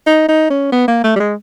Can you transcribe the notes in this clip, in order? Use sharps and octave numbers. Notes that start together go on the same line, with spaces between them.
D#4
D#4
C#4
B3
A#3
A3
G3
G#3